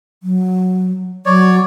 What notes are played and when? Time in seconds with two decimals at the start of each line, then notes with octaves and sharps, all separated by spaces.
0.23 F#3
1.26 F#3 C#5 D5